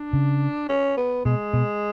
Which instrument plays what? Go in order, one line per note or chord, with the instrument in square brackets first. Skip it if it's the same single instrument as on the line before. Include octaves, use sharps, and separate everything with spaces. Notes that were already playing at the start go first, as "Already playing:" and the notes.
Already playing: [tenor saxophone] D4
[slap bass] C#3
[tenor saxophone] C#4
B3
[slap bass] B2 [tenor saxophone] G#3
[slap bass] B2